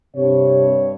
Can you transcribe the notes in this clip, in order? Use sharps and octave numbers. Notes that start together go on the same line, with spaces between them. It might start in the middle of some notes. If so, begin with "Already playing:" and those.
G2 C3 C#5